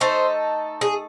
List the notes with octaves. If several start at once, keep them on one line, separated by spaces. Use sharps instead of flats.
A3 D#4 A4 C5 D#5
G#4